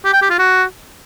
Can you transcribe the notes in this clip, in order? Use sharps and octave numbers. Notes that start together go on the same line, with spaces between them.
G4
G5
G4
F4
F#4